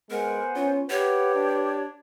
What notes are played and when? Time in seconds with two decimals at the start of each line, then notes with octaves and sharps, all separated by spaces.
0.10 G#3 B3 A#4 C5 F#5 G#5
0.56 C#4 F4
0.90 G4 B4 C#5 F#5
1.35 D4